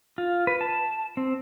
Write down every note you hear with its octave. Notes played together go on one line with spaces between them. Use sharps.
F4
B4
A5
C4